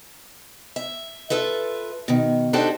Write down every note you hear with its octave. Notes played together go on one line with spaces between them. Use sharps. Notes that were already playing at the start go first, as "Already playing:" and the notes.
E5
F4 A4 B4 E5
B2 D#3
D4 D#4 F#4 G4 A4 C5